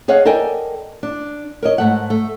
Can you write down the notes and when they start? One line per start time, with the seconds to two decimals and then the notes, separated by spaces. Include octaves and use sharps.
0.08 G#4 C#5 D#5 F5 F#5
0.25 A4 A#4 D5 D#5 G5 G#5
1.03 D4
1.63 A#4 C#5 D#5
1.78 G#2 A3 F#5
2.10 A3